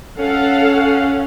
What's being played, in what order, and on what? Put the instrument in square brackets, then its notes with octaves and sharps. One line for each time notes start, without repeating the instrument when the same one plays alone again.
[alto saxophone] C#4 [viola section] A4 F5 F#5